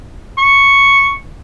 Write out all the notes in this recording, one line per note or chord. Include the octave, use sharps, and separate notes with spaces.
C#6